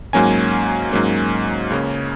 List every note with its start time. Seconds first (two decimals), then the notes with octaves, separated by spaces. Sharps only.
0.13 G#2 F#3 A#3 C#4 G#5
0.91 G#2 F#3 A#3 C#4
1.70 C#2 C#3 A#3 C#4